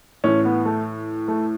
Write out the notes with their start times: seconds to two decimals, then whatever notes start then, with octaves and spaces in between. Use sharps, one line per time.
0.24 A2 E3 C#4
0.45 B3
0.65 A3
1.28 A3